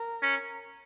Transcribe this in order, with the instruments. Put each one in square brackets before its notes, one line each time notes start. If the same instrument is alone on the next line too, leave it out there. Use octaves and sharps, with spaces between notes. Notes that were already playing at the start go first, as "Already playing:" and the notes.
Already playing: [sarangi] A#4
[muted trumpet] C#4